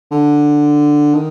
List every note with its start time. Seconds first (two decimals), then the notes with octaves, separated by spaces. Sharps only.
0.12 D3
1.14 D#3